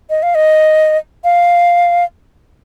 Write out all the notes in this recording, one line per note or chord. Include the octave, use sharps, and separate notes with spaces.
D#5
F5
D#5
F5